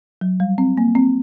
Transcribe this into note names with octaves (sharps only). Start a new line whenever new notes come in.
F#3
G3
C4
A#3
C4